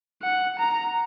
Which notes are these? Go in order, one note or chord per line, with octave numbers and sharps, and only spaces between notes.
F#5
A#5